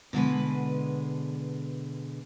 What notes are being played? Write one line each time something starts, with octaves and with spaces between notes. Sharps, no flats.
B2 D3 G#3 B4